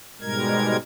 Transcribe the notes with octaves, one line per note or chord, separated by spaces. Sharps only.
G#2 B2 G3 G#3 A#4 G#6